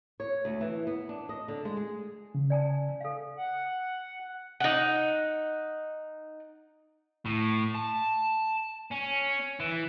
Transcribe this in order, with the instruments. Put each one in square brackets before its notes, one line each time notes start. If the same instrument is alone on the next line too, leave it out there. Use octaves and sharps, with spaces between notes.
[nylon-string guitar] C#5
D2
E3
B3
D4
D#5
D3
G#3
G#4
[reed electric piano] C#3
[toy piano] D5 G#5 A5
A4 F5
[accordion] F#5
[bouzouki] D#4 F#5
[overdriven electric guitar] A2
A5
C#4
E3